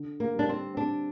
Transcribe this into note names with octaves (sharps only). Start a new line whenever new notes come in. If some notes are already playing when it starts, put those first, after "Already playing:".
Already playing: D3
A#3
G3 D4
C4
C4 D4